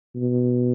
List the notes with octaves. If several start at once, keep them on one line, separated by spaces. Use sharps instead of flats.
B2